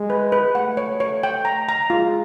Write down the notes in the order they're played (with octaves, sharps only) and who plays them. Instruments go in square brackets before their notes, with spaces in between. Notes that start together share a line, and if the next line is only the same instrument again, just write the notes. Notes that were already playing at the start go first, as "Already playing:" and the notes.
Already playing: [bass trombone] G#3
[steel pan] B4
B4
[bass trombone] A3 [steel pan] F#5
[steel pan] C#5
C#5
G5
A#5
A#5
[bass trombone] G#3 [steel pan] F4